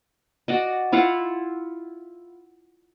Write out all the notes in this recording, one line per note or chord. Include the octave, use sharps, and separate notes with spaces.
F#4 D5 D#5
E4 F4 F5 F#5